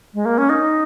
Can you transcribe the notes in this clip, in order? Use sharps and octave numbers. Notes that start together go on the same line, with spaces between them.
G#3
A#3
C#4
D#4